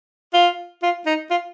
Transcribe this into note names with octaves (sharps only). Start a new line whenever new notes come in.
F4
F4
D#4
F4